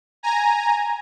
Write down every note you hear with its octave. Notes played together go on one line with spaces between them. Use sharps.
G#5 A#5